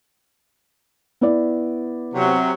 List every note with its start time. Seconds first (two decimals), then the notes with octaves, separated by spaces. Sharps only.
1.21 B3 E4 D5
2.14 C3 F#3